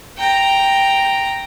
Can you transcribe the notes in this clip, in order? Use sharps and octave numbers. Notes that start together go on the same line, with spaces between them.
G5 A#5